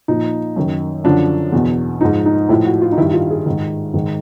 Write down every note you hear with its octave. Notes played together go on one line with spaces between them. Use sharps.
A#2 F3 D#4
F#2 D#3
F#2 D3 F3 D4
E2 B2
G#2 F3 D#4
D#4
A2 F3 E4
F#4
F4
D#4
G2 D#3 E4
F4
G#4
G#2 D#3
G#2 D#3